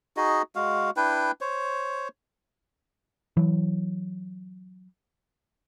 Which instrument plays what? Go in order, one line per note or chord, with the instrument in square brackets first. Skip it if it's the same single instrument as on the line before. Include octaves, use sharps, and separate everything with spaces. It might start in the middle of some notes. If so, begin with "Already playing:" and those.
[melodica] D#4 F#4 G#4 D#5
G#3 F#4 F5
D4 E4 B4 G5
C5 C#5
[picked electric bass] E3 F#3